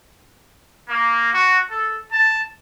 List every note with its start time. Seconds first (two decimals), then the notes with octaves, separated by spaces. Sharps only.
0.89 A#3
1.33 F#4
1.70 A4
2.12 A5